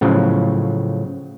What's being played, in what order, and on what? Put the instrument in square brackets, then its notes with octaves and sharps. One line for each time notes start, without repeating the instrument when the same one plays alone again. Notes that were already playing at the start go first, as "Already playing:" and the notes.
[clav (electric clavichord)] A2 C#3 F3 F#3